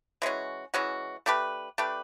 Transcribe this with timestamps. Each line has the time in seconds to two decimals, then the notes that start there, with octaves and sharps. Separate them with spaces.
0.22 E3 G#3 C#4 F#4
0.74 E3 G#3 C#4 F#4
1.26 A3 D4 G4 B4
1.78 A3 D4 G4 B4